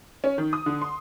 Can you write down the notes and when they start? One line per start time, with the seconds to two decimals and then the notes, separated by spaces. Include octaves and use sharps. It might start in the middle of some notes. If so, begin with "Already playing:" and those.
0.24 C#4
0.38 D#3
0.53 D#6
0.66 D3
0.82 C6